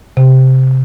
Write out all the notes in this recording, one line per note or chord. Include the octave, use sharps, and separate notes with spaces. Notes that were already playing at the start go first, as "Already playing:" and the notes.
C3